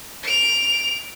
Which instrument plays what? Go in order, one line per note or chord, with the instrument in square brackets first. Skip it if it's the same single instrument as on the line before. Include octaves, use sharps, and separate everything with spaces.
[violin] D7 F7